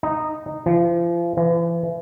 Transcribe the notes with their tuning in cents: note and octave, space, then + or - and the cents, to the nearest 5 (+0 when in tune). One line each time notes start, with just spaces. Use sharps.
D#4 -10
F3 -35
E3 +40